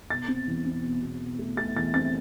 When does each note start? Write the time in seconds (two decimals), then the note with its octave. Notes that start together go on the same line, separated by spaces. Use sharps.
0.10 B2 A6
0.28 C4
0.47 E2
0.66 C4
0.83 B2
1.02 B2
1.21 B2
1.39 A3
1.57 A3 A6
1.76 E2 A6
1.94 C4 A6